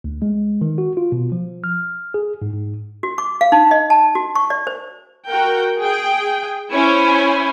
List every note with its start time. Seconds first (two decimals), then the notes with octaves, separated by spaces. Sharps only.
0.04 D2
0.22 G#3
0.61 D#3
0.78 F#4
0.97 F4
1.12 B2
1.32 F3
1.64 F6
2.14 G#4
2.42 G#2
2.54 G#2
3.03 F#4
3.18 D6
3.41 F5
3.52 D#4
3.71 D#5
3.90 A5
4.15 F#4
4.35 C#6
4.50 D5
4.67 C5
5.28 F#4 A#4 G5
5.77 G#4 G5
6.72 C#4 E4 C5 C#5 G#5